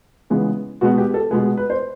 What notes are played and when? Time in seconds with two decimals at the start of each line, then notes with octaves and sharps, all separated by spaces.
0.30 C#3 E3 G#3 B3
0.81 B2 G#3 B3 F#4
0.98 G4
1.14 A4
1.31 B2 G#3 B3 G#4
1.57 B4
1.70 C5